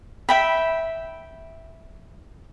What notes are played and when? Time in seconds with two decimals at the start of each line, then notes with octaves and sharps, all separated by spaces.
0.29 E5 G5 B5